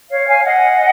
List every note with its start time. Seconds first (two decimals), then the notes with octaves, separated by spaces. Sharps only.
0.09 C#5 F5
0.27 F5 G#5
0.37 F5
0.44 D#5 F#5